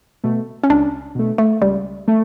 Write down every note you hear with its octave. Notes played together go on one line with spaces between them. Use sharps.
B2 A3
C#4
C#2 D4
B2 A3
A3
C#2 G3
A3